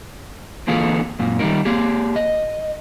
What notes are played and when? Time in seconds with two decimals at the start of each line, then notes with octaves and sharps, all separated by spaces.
0.67 D3 E3 A#3 F4 G#4 A4
1.19 F#2 A#2
1.39 D#3 G3 G#3 C#4 D#4 A#4
1.65 A#3 G4 G#4
2.16 D#5